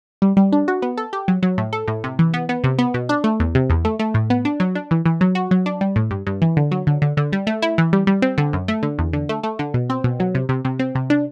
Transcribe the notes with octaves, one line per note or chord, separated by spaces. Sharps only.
G3
G3
D4
F#4
B3
A4
G4
F#3
F#3
A2
A4
A2
C3
E3
B3
B3
C3
B3
B2
D4
A3
E2
C3
E2
A3
A3
A2
B3
D4
F#3
D4
E3
E3
F#3
F#4
F#3
D4
G3
A2
G2
G2
E3
D3
F#3
D3
D3
D3
G3
A3
E4
E3
G3
G3
C4
D3
F#2
A3
D3
E2
D3
A3
A3
D3
B2
C4
B2
F#3
C3
C3
C3
C4
C3
D4